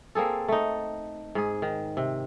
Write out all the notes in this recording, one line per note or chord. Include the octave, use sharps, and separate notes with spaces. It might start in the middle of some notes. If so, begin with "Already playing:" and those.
A#3 C4 G#4 A4
A3 D#4
G#2 G#4
D#3
C3